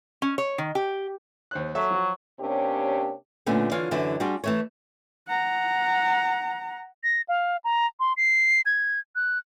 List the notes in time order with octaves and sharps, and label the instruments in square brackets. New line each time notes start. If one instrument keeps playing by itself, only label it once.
[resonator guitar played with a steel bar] C#4
C#5
D#3
G4
[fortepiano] D#2 C5 F#6
[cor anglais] F#3 [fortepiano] A4 E5
[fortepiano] F3 F#4
[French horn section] C3 A#3 C#4 D4 G4 C#5
[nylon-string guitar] A#2 D3 A3 B3 C#4
D3 E3 F4 C#5 F5
F#2 D3 E3 E4 F#4
G3 D4 F4 F#4 G#4
E3 A3 C#5
[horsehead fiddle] F#5 A#5
[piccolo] A#6
F5
A#5
C6
C7
G#6
F#6